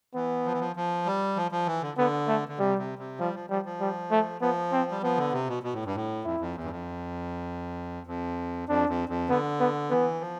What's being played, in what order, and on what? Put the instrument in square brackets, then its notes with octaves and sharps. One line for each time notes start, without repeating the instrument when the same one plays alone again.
[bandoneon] E3 [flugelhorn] B3
[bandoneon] F3
E3
F3
F3
G3
F3
F3
E3
D3
[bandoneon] D3 [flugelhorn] B3
[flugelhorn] A3
[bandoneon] D3
[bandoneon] C3 [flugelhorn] G3
[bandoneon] C3
C3
[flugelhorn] F3 [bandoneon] G3
[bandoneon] F3
[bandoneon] F3 [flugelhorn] G3
[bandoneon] F3
[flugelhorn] G3
A3
[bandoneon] F3 [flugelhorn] B3
[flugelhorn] C4
[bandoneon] G3
[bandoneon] F3 [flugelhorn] B3
[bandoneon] D3
C3
B2
B2
A2
G2
A2
[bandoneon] F2 [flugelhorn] E4
[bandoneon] F2
E2
G2
F2
F2
[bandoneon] F2 [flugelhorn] D4
[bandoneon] F2
F2
[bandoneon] D3 [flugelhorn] B3
[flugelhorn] B3
[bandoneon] E3 [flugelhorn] B3
[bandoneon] F3